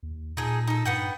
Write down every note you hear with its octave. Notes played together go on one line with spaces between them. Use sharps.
D#2
A#2 D#4 G#4 A4
D#4 A4
G2 B3 F#5 G5